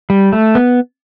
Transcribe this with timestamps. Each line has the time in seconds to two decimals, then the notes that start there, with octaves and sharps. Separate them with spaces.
0.10 G3
0.33 A3
0.55 B3